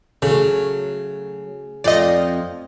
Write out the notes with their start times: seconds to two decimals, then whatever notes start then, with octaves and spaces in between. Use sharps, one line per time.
0.22 C#3 F#3 A3
1.84 F2 F3 A3 D5 D#5